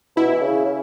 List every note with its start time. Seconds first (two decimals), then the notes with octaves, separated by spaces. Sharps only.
0.16 B2 E4
0.33 E3
0.41 C#3
0.65 C#3